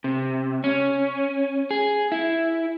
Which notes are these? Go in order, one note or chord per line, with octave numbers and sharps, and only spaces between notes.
C3
C#4
G#4
E4